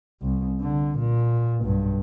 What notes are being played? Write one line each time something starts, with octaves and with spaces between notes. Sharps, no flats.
C2
D3
A#2
B1 G2